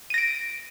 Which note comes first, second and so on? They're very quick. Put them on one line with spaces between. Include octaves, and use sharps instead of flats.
D#7 A#6 D7